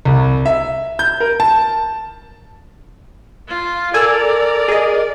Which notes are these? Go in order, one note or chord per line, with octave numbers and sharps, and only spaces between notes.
C2
E5
G6
A#4
A5
F4
A4 A#4 D5 G#5 E6
G#4 D#5